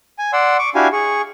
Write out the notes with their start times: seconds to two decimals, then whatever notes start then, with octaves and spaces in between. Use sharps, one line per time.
0.19 G#5
0.33 D5 F#5 C6 E6
0.59 C#6 D6
0.75 D4 E4 F#4 G4 F5 G#5
0.92 G#4 C#6